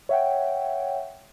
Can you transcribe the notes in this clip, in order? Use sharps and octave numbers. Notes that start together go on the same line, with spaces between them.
C#5 E5 F#5 G5